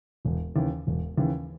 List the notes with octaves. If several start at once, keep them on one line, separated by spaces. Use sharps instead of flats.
E1
D#2 C#3 E3
E1
D#2 C#3 E3